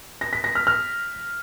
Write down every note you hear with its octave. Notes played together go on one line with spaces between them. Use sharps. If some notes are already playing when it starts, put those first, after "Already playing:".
A#6
B6
A#6
F6
F6